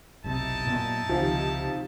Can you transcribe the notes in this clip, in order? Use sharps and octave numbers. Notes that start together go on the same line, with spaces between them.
F1 B1 C3 D#4 E4 A5
F#2 A#2 B3
C#2 C3 D#3 F3